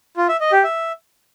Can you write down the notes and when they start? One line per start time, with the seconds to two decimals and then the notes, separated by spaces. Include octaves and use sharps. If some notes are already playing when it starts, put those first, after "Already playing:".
0.17 F4
0.29 E5
0.40 D#5
0.52 G4
0.64 E5